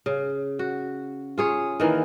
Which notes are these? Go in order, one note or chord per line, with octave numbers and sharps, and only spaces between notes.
C#3
F#4
F4 G#4 C#5
D#3 E3 A#3